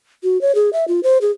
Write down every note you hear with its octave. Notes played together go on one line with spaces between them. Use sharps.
F#4
C#5
G#4
E5
F4
C5
G#4